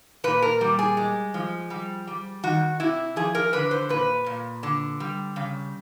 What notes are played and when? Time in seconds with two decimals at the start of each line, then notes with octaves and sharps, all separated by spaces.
0.24 A#2 B4
0.42 A#4
0.61 G3
0.79 G#4
0.97 G#3
1.34 F3
1.70 G3
2.07 G3
2.43 D#3 F#4
2.80 C3 E4
3.16 F3 G#4
3.35 A#4
3.53 D3 B4
3.71 C5
3.89 A#2 B4
4.26 A#2
4.63 D3
5.00 G3
5.36 C#3